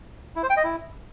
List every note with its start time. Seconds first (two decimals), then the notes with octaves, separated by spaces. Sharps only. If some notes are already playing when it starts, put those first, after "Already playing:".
0.36 E4
0.43 C5
0.50 G5
0.57 D#5
0.64 E4